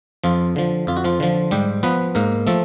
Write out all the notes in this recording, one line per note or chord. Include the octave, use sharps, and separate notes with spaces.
F2 F3 F4
D3 F3
F2 F4
F#4
F3 F4
D3 F3
G#2 G3 G4
F3 B3 B4
G#2 A#3 A#4
F3 A3 A4